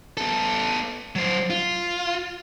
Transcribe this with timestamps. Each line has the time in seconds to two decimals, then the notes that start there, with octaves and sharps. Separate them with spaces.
0.17 B3 A4
1.16 F#3 C5
1.50 F4